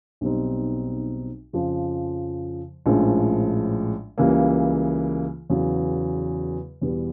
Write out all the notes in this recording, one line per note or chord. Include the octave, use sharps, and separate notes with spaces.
B1 B2 G3 C4 D#4
F2 C#3 F3
A#1 A2 F3 G#3 C#4
C#2 C#3 E3 G3 A#3
E2 C#3 F#3 B3
E2 B2 G3 B3